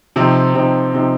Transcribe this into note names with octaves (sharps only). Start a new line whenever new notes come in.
C3 F3 C4 D#4
C3 F3 C4 D#4
C3 F3 C4 D#4